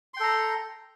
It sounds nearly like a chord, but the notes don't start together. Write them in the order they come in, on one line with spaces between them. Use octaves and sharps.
C6 G5 A4 A#5